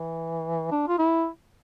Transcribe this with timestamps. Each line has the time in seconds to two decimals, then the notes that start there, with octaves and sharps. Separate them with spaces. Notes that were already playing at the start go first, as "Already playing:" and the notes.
Already playing: E3
0.72 D4
0.88 F4
0.99 E4